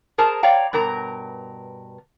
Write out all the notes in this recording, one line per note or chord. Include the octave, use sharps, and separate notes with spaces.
G#4 A#4 C5 A5 A#5
C#5 D5 F5 G5 A#5
G2 B2 A#4 A#5